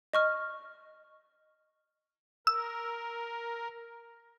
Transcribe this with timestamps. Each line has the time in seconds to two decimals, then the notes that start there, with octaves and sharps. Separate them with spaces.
0.14 D#5 C#6 F6
2.47 A#4 E6